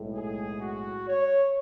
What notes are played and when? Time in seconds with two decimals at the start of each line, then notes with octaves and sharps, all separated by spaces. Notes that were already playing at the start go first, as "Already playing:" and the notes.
Already playing: B1 A2 G#3
0.15 G#4
0.61 F#4
1.08 C#5